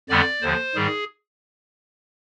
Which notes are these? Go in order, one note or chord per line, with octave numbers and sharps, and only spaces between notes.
F2 D3 G3 B3 D5
D#2 D3 F3 C5
G#2 D#3 G3 G#4